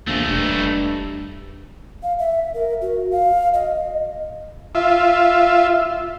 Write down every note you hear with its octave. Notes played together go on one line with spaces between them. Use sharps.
A#1 E2 A3 D#4
E1 G2
F5
E5
A#4
F#4
F5
D#5
F4 E5